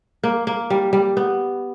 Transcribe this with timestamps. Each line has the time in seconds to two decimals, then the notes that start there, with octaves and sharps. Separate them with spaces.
0.23 A#3
0.47 A#3
0.70 G3
0.93 G3
1.17 B3